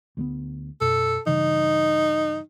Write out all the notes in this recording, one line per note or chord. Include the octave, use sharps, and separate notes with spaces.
D2 G3 B3
F#2 B2 A4
G2 C#3 E3 D#4